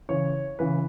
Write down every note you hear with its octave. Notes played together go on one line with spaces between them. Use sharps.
C#3 E3 C#5
C#3 E3 B4